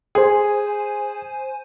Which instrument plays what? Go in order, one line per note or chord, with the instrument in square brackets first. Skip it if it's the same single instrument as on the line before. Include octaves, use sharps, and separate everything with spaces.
[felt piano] G#4 [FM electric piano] C5 G#5